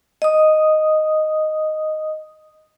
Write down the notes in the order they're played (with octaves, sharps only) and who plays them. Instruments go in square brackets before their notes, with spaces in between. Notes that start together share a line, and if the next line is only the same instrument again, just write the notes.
[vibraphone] D#5 D#6